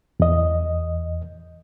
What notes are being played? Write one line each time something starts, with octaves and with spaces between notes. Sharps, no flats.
E2 D#5